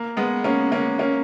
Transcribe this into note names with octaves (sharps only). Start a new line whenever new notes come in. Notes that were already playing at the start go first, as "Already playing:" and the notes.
Already playing: A#3
G#3 B3
A#3 C#4
A#3 C#4
A#3 C#4